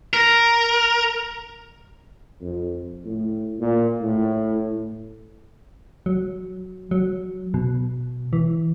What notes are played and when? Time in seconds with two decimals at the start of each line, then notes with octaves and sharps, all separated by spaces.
0.14 A#4
2.41 F2
3.05 A2
3.59 A#2
4.01 A2
6.06 F#3
6.91 F#3
7.54 B2
8.33 E3